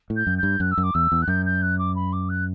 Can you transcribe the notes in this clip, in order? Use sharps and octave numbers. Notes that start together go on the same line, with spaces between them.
A2
G6
F#2
G6
G2
F#2 F#6
E6
F#2
D6
E2 E6
E2
F#6
F#2 G6
G6
F#6
D6
B5
D6
F#6